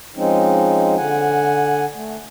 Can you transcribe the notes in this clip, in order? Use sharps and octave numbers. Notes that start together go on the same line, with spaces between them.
F3 G#3 C4 C#4 D#4
D3 F#5 G#5
A3